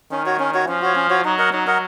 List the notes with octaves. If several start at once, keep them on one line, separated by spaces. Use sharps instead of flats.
D#3 C#4
F#4 C#5
C#4
F#4 C#5
F3 C#4
F#4 C#5
C#4
F#4 C#5
F#3 D#4
A#4 D#5 F#5
F#3 D#4
A#4 D#5 F#5